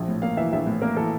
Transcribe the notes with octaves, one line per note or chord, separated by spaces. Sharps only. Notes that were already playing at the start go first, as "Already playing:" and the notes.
Already playing: A#1 F3
A2
A#3 F5
E3 E5
A#1 E5
A2
A#3 A#4
E3 A4